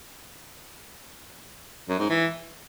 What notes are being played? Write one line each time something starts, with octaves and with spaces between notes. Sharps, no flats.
F#2
G#2
E3